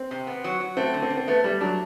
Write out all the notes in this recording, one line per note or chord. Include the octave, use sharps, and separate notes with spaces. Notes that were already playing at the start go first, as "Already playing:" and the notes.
Already playing: C4
C3
B3
F#3
F#3
A3 C4
D3
C4
D3
C4
A3 B3
G3 A3
F#3 D4